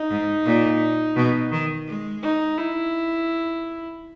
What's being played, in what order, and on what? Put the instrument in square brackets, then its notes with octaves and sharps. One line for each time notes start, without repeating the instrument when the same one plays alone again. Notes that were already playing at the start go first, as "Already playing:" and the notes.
Already playing: [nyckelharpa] D#4
[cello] G#2
A#2
B2
D#3
G#3
[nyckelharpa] D#4
E4